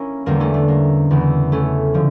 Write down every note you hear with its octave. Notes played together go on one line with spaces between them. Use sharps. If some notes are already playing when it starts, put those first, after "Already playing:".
Already playing: A#3 C#4 E4
E2 D3 G3 A#3
A3 C#4
A3
A#3
E2 C#3 E3
A3 C#4
D3 F3